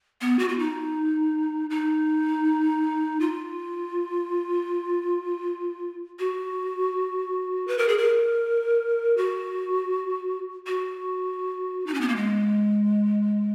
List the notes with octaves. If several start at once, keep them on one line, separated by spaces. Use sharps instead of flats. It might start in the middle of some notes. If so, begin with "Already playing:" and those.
B3
F#4
F4
D#4
D#4
F4
F#4
B4
A#4
G#4
A#4
F#4
F#4
D#4
C#4
B3
A#3
G#3